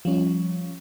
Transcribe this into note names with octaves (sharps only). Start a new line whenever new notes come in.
F3 G3 C#4